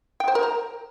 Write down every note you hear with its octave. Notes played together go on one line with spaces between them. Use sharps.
G5
C5
A#4
A#5